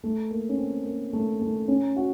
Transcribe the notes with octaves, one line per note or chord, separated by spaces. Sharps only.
A3
A#3
C#4
C4
A#3
A3
A3
C#4
F#4